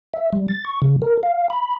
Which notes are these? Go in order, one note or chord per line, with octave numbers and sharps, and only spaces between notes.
E5
G3
A6
C#6
C#3
A#4
F5
B5